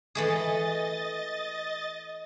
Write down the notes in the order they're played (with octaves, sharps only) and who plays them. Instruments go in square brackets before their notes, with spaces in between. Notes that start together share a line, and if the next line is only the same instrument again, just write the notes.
[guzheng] E3 A3 G#4 [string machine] D#5 A6